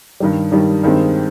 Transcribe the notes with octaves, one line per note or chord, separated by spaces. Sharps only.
G2 D#3 G3
G2 D#3 G3
G2 D#3 G#3 C4